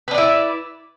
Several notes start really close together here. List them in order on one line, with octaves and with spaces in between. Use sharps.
B4 D4 D5 E4